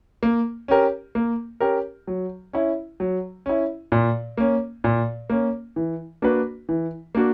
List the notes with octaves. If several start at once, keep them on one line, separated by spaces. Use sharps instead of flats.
A#3
C#4 G4 A#4
A#3
C#4 G4 A#4
F#3
C#4 E4
F#3
C#4 E4
A#2
A#3 C#4
A#2
A#3 C#4
E3
A#3 D4 F#4 B4
E3
A#3 D4 F#4